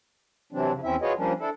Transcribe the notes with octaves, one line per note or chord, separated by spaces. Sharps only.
C3 E3 F#3 C4 D4
F2 C#3
E2 C4 C#4 E4 E5
F4 F#4 G#4 B4 C#5 D#5
F3 G3 A#3 C#4 D4
D4 E4 A4